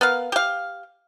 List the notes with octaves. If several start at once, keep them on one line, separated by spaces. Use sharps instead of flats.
B3 A#4 F5
G4 F5